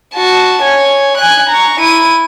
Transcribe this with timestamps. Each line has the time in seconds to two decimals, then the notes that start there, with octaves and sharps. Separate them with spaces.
0.14 F#4 A5
0.63 C#5 G#5
1.17 G#5 F#6
1.49 A#5 C#6
1.80 E4 D#7